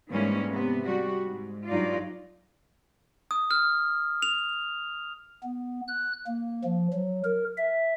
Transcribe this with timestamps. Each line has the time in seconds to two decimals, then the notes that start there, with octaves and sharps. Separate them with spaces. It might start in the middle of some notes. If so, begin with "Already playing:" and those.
0.10 G#2 E3 G3 A#3 C#4
0.48 C3 B3
0.86 G3 F#4
1.24 G#2
1.67 G2 F#3 D#4 F4 D5
3.31 D#6
3.51 F6
4.22 F7
5.44 B3
5.88 F#6
6.27 A#3
6.64 F3
6.93 F#3
7.24 A#4
7.57 E5